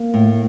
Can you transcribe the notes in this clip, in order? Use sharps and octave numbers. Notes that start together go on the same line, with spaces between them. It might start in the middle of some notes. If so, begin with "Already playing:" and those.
Already playing: A#3
A2